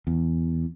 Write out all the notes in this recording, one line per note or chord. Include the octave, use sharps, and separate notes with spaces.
E2